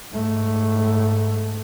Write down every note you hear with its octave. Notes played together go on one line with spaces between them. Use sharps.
G#2 A3